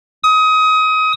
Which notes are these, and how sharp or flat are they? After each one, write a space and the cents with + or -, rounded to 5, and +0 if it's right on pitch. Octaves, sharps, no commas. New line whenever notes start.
D#6 +25